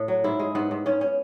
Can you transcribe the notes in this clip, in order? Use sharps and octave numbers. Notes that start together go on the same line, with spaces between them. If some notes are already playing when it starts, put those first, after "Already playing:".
Already playing: A2
F#3
G#2 E4
G#3
G#2 B3
G#2
G#2 C#4
C#4